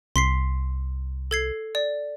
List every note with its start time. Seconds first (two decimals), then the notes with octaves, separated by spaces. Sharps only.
0.16 C2 C6 B6 C7
1.31 A4 G#6 C7
1.75 D5